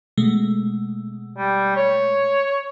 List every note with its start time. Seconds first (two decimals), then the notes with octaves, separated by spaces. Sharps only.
0.17 B2 G#3 A3
1.37 G3
1.76 C#5